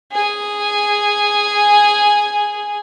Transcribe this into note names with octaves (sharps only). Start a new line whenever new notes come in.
G#4 G#5